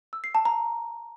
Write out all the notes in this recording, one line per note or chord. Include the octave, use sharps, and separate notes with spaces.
E6
C7
A5
A#5